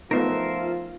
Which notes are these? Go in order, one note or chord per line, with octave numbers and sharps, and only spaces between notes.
F3 A3 B3 D#4 F4 A#4 C5 E5